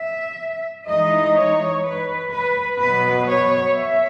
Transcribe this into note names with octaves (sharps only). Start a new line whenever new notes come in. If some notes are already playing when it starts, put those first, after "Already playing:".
Already playing: E5
E3 G#3 D#4 D#5
C#5
B4
B4
B2 F#3 B3 B4
C#5
E5